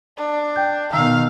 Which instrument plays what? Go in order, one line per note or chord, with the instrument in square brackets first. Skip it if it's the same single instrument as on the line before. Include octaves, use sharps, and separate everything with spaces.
[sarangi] D4
[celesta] G5 G6
[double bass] B2 D#3 [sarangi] F5 [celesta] A#5 E6